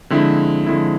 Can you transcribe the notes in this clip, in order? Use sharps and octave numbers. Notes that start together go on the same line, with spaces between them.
D3 F3 G#3 C4 E4
D3 F3 G#3 C4 E4